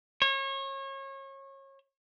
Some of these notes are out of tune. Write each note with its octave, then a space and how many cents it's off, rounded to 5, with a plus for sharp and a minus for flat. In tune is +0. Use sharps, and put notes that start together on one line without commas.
C#5 -30